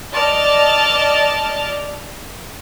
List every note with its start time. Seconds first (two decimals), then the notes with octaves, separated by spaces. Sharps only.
0.13 D5 D#5 A5 F6